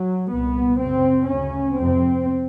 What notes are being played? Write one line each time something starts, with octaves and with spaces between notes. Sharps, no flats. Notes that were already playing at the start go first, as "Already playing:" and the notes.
Already playing: F#3
C2 A#2 B3
F#2 C#3 C4
D2 C#3 C#4
F2 C3 C4